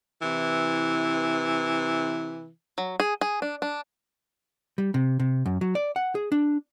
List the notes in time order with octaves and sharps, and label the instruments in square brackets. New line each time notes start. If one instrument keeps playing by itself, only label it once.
[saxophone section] C3 E3
[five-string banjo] F#3
G#4
G#4
D4
D4
[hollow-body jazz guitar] G3
C3
C3
F#2
F#3
D5
F#5
G#4
D4